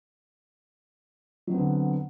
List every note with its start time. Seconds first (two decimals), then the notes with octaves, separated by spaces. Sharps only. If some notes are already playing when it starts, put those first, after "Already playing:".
1.47 F#3
1.51 C4
1.54 B3
1.58 D3